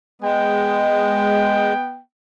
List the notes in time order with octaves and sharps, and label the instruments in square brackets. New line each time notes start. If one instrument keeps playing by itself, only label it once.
[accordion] G#3 [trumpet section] B3 G5